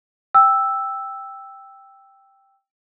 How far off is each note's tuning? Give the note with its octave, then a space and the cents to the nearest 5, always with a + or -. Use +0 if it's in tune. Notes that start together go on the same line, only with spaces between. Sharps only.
G5 +0 E6 +0